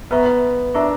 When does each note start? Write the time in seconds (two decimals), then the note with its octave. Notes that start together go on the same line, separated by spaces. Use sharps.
0.11 B3 B4 E5 A#5 C#6
0.74 D4 E4 A#4 E5 A#5 C#6